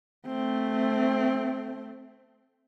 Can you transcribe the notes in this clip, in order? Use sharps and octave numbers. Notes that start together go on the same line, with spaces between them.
A3 C4